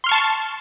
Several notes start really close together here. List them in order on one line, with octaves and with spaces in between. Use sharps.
C6 F6 C#6 A5